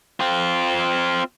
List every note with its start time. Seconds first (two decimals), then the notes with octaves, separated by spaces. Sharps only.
0.20 C4 F4